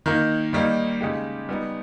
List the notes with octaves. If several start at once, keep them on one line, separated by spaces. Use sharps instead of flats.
D#3 A#3 D#4
D#3 G3 A#3 D#4
C#3 G#3 D#4 G4
G3 B3 D#4